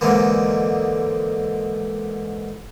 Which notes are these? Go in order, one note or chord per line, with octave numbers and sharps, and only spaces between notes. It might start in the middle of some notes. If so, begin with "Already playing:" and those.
G#2 D3 E3 A#3